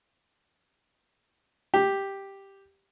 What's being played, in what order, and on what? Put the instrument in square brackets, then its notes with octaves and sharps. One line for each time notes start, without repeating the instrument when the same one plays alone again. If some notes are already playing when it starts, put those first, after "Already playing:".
[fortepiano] G4